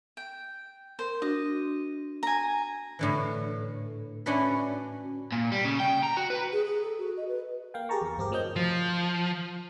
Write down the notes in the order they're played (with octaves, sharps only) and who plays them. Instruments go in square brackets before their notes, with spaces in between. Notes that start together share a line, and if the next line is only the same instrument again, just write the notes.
[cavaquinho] G5
[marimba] A#4 [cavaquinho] C5
[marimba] D4 F#4 [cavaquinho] D#5
[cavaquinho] G#5 A#5
[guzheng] A2 D3 E3
C#4 D4 E4 F#4 A4 B4
[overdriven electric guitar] A#2
G3
C#3
G5
A#5
F#4
B4
[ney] G#4
G#4
A4
F#4
D#5
B4
[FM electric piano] A#3 F5 G5
G4 G#4 A#4 A5 A#5 C#6
E2
G1 C4 G4 A#4
A2 F#3 C4 D#5 G6
[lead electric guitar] F3